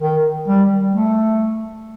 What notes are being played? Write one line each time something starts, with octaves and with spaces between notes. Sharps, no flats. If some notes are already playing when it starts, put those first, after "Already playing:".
D#3
G3
A3